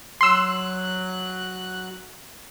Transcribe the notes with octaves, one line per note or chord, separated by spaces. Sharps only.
F#3 C6 E6 F#6